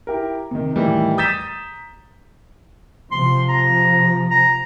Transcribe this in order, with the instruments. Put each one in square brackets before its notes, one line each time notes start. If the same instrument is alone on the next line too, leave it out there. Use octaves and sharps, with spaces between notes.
[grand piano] E4 G4 A#4
C3 D#3
A2 D#3 E3 G3
A#5 D#6 G6 A6 B6 E7
[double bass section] C3 F3 [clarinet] C6
[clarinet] A#5
A#5